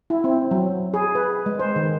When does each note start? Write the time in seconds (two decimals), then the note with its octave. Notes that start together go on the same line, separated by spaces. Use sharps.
0.10 E4
0.24 C4
0.51 F#3
0.94 G#4
1.15 B4
1.46 G#3
1.59 C5
1.76 D#3